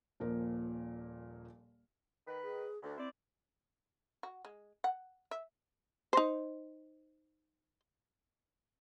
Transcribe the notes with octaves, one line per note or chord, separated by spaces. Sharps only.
D#1 A#2 F3 A#4
D#3 B4
G#4
D2
C4 E4 C5 D5
F#4
G#3
F#5
E5
D#4 C5